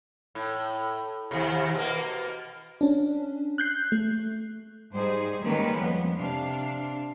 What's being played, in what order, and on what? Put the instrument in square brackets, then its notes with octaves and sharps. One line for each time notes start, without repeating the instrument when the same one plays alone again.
[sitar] A2
D#2 C3
B2 A#3
[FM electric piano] C#4 D4
F#6 G6 C7
A3
[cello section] G#2 G3 D#4 G#4 C5
D#3 G3 G#3 A#3 C#4 B4
F2 B3
C3 D4 F5